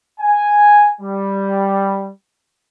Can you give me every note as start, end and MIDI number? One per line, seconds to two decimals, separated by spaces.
0.20 0.91 80
1.00 2.09 55